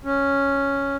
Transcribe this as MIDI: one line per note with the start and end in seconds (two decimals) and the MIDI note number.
0.04 0.97 61